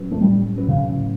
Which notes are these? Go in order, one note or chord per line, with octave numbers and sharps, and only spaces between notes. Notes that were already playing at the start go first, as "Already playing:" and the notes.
Already playing: A2 F#3 C#4 F#4 B4
A3
A2 G3
F#3 C#4 F#4 B4
C#3
A2